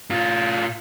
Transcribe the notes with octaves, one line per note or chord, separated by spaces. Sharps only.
A2 F4